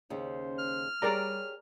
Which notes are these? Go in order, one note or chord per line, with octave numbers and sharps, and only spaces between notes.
D#2 C#3 C#4 C5
F6
G3 G4 G#4 A#4 C#5 D5 A#5